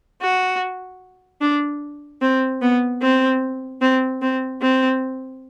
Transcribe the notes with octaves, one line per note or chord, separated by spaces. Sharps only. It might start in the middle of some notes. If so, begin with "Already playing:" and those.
F#4
D4
C4
B3
C4
C4
C4
C4